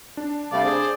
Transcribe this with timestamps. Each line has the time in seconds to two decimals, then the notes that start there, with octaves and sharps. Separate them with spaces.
0.17 D4
0.52 C3 G3 A3 D5 F5
0.64 G#4 C5